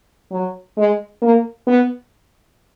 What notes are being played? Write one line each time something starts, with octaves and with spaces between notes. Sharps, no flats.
F#3
G#3
A#3
B3